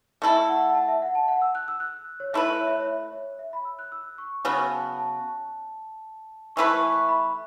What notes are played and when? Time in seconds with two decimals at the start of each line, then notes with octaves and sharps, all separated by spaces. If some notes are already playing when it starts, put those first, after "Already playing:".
0.22 A3 E4 A4 E5
0.49 F#5
0.69 F#5
0.75 A5
0.88 E5
1.02 F#5
1.15 A5
1.28 F#5
1.42 E6
1.55 F#6
1.68 E6
1.80 F#6
2.20 C#5
2.33 A3 E4 B4 E5
2.61 C#5
2.67 E5
2.75 C#5
2.87 E5
3.12 C#5
3.39 E5
3.53 B5
3.65 E6
3.79 F#6
3.92 E6
4.18 C#6
4.45 C#3 F#3 B3 F#4 B5
4.71 A5
4.98 A5
6.56 E3 A3 E4 B4 C#6
6.83 C#6
7.09 B5